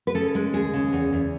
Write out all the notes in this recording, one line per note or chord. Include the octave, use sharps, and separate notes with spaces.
B4
C#3 A4
G#3
D#2 G#4
C#3
E2
E2